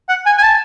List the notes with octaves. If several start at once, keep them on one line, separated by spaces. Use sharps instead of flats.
F#5
G#5
G#5
A5